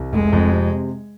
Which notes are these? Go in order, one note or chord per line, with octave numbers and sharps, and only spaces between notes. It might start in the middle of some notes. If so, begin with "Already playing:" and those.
Already playing: C2
F1 G#3
F2
C3